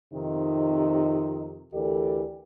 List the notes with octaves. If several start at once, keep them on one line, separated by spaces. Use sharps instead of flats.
F2 C3 D#3 D#4
D2 E3 G4 A4 A#4 D5